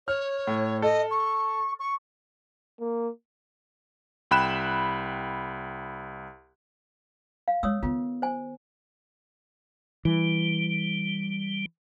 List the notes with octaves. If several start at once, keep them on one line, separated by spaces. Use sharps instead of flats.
C#5 F6
A2
A4 D#5
C#6
C#6
A#3
C2 G5 B5 F#6 E7
F5
G#3 C#5 D#6 E6
D#3 B3 F4
C5 G#5
E3 G3